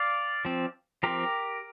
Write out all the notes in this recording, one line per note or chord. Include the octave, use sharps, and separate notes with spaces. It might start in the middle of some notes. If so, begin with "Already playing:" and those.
Already playing: D5 F5
F3 C4
F3 C4 G4 A#4